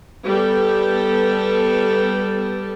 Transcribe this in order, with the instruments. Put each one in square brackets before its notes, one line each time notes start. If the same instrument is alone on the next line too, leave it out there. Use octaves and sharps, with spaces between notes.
[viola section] G3 B3 A4